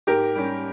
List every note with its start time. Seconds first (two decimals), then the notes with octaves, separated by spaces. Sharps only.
0.07 G#2 G4 A#4
0.35 G3 C#4